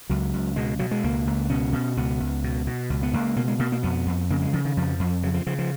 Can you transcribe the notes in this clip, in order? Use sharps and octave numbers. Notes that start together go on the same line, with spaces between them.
C#2 F#3
C#2
B2 G#3
B2 F#3
G#3
C#2 A#3
C#2
B2 C#4
B2
C#2 B3
C#2
B2
B2
C#2
B3
C#2 A#3
B2 A#3
G#3
B2 A#3
A#3
F2 B3
F2
C#3 A#3
G#3
C#3 F3
D#3
F2 F3
F2
C#3 F#3
F3
C#3 F3
F3